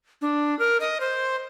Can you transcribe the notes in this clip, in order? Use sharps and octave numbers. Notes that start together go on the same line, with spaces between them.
D4
A#4
D#5
C5